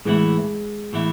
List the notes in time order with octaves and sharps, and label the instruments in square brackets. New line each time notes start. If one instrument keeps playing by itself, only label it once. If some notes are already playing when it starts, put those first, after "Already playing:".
[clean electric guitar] A2 E3 B3 E4 [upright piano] G#3
[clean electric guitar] A2 E3 B3 E4